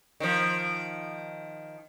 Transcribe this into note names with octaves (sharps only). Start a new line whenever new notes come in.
D#3 F3